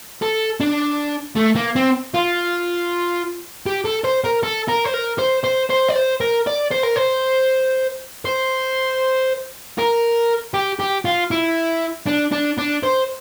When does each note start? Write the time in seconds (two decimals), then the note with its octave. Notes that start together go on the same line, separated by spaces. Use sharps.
0.22 A4
0.60 D4
1.37 A3
1.56 A#3
1.76 C4
2.14 F4
3.66 G4
3.85 A4
4.04 C5
4.24 A#4
4.43 A4
4.68 A#4
4.85 C5
4.94 A#4
5.19 C5
5.44 C5
5.70 C5
5.89 D5
5.96 C5
6.21 A#4
6.47 D5
6.72 C5
6.84 A#4
6.96 C5
8.25 C5
9.78 A#4
10.54 G4
10.80 G4
11.05 F4
11.31 E4
12.07 D4
12.32 D4
12.58 D4
12.83 C5